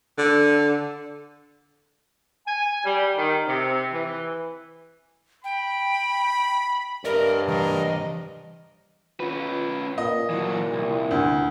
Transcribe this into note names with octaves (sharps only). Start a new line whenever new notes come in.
D3
G#5
G3
D#3
C3
E3
G5 B5
G2 A#4 D5 D#5
E3 G3 A#4 D#5
C#4 F4 B4
A#2 D#5
E3 F#3
C2
D2